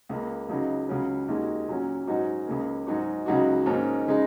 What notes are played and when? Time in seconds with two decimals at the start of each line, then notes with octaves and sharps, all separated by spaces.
0.09 C#2 C#3 A#3
0.49 C#2 C#3 F#3 D#4
0.89 C#2 C#3 F#3 C#4
1.28 D#2 D#3 G#3 F#4
1.68 A#2 F#3 C#4
2.07 G#2 F#3 D#4 F#4
2.47 C#2 C#3 A#3
2.87 G#2 F#3 D#4 F#4
3.26 C#2 C#3 F#3 D#4 F#4
3.66 G#2 D#3 A#3 C#4
4.07 C#3 G#3 D#4